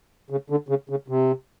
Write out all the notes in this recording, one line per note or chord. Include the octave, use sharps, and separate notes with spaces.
C#3
D3
C#3
C#3
C3